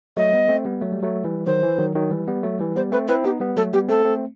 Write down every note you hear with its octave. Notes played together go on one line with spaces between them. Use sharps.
F#3 A3 D#5
G3 B3
A3 C4
G3 B3
F#3 A3
G3
F#3 A3
E3 G3
D#3 F#3 C5
E3
D#3 F#3
D#3 F#3
E3 G3
G3 B3
F#3 A3
E3 G3
G3 B3 C5
A3 C4 B4
C4 E4 B4
B3 D#4 G4
G3 B3
F#3 A3 A4
G3 B3 G4
A3 C4 A4
A3 C4